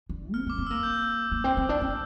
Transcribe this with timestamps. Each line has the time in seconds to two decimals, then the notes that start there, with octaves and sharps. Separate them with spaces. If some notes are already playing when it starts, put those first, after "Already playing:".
0.09 D3
0.34 C4 F6
0.46 C4
0.50 D6
0.58 C4
0.67 A#3 E6
0.83 G6
1.32 A#3
1.44 C4
1.57 C4
1.69 D4
1.81 C4